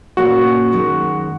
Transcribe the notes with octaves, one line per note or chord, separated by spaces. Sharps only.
A#2 A#3 C#4 F#4
F#2 D#3 G#3